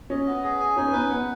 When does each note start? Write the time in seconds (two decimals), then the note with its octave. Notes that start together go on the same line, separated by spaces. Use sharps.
0.10 C#4 D#5
0.27 B3
0.44 G#4
0.60 G#5
0.77 C#4 D#4
0.87 B3
0.93 C#4 B4
1.10 B3 F#5